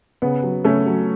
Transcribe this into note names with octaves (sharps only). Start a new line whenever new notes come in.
C#3 B3
F#3
C#3 A3 C#4
F#3